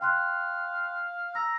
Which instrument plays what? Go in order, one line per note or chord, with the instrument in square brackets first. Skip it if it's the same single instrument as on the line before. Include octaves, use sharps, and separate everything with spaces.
[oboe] F5 [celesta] G5 C6 F#6
[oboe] A#5 [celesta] E6